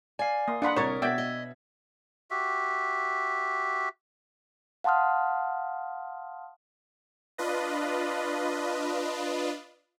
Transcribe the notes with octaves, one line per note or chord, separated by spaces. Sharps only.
D5 F5 G#5
A#3 C6 D#6
D4 F5 F#5 B5 C6 D#6 B6
C2 A#4 C#5 A#5 A6
B2 D5 E5 F#5 G5 E6 G#6 B6
D#5
F#4 G4 E5
F5 F#5 A5 C6 D#6 F6
D4 F4 B4 D#5